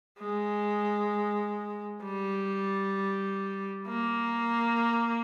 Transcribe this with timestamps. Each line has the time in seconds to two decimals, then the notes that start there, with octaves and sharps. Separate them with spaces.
0.18 G#3
2.03 G3
3.88 A#3